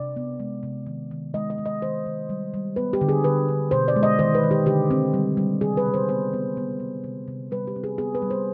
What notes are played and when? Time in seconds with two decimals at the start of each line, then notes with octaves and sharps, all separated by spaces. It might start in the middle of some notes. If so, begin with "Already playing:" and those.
Already playing: C3 D5
0.16 B3
0.40 G#3
0.63 C3
0.86 D#3
1.11 D#3
1.34 G#3 D#5
1.50 D#5
1.58 G#3
1.66 D#5
1.82 D#3 C5
2.06 D#3
2.29 G3
2.54 G3
2.76 B3 B4
2.93 G4
3.01 D3
3.09 G#4
3.24 D3 B4
3.49 D3
3.71 B2 C5
3.88 D5
3.96 G#3
4.03 D#5
4.19 D#3 C5
4.35 B4
4.44 D#3
4.51 G4
4.66 D3 G4
4.91 C4
5.14 G3
5.37 G3
5.61 C3 G#4
5.77 B4
5.86 C3
5.94 C5
6.09 B3 C5
6.33 B3
6.57 B3
6.80 B3
7.04 C3
7.28 C3
7.51 G3 B4
7.67 G4
7.76 C4
7.84 G#4
7.98 B3 G#4
8.15 B4
8.22 G3
8.30 C5